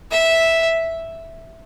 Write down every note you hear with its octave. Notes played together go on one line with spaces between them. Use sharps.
E5